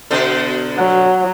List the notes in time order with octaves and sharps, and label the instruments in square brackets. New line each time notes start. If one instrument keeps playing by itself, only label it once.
[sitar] B2 D3 A4
[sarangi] F#3